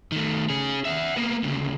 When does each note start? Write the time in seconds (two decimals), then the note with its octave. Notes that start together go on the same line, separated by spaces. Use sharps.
0.12 D#3 A3
0.50 C#4 G#4
0.85 E5 F#5
1.16 A#3 B3
1.43 D2 C#3